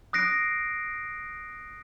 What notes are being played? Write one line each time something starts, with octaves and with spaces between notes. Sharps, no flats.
D#6 F#6 A#6 C7 D7